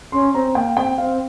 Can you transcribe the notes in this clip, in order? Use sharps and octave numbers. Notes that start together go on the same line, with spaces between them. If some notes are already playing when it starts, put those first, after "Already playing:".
C#4 C6
C4 A#5
A#3 G5
C4 G5
C4 F5